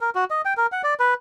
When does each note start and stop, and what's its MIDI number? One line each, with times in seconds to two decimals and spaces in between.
0.01 0.10 70
0.15 0.24 66
0.30 0.42 75
0.45 0.54 79
0.57 0.67 70
0.72 0.82 78
0.84 0.94 74
1.00 1.14 71